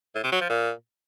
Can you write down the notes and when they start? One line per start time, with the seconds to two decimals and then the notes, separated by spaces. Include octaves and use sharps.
0.15 A2
0.24 C3
0.32 F#3
0.41 F3
0.50 A#2